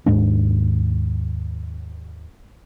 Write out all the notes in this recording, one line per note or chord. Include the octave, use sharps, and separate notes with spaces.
D#2 G#2 G#3 D4